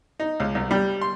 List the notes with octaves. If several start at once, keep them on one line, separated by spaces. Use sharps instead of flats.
D#4
C#2
C2
G3
C6